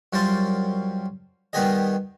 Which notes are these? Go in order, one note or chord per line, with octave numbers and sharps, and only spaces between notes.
F#2 G3 F4 C5 A5
D#3 G3 B3 G4 G#4 D#5